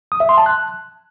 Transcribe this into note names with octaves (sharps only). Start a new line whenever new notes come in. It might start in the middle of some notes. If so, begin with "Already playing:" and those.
D#6
E5
C6
A5
F#6